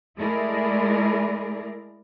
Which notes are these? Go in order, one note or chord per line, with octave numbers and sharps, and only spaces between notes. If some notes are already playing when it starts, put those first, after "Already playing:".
G#3 A3 E4 G#4 A#4 D5